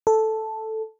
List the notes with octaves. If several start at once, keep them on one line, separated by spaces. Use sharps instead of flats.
A4